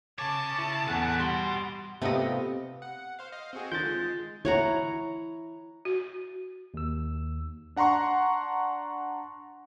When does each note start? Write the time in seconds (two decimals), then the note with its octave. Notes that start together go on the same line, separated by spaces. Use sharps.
0.19 C#3 C#5 A5 D6
0.59 E4
0.88 E2 A4 B4 F#5 G#5 F#6
1.19 G3 F#4 F#5 B5 C6 A6
2.02 C3 A3 B3 C4 F4 G4 D#5
2.82 F#5
3.19 C5 F5
3.32 D#5 F5
3.53 C4 F#4 G#4
3.72 D3 D#3 C4 F4 G6 A6
3.85 G#3
4.45 E4 C#5 F#5 A#5
5.85 F#4
6.74 D#2 E6
7.76 D4 F#5 A#5 C6 C#6